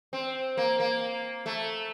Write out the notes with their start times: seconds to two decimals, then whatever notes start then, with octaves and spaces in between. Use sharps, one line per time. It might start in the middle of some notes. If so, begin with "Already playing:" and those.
0.13 C4
0.57 A#3
0.80 A#3
1.46 A3